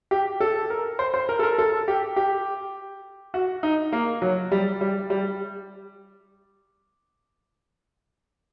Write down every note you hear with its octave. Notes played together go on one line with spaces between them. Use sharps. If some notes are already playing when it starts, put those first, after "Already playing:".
G4
A4
A#4
C5
C5
A#4
A4
A#4
A4
G4
G4
F#4
D#4
A#3
F#3
G3
G3
G3